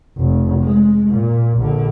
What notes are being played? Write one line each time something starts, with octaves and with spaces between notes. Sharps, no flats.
F1
G#3
A#2
A#1 D3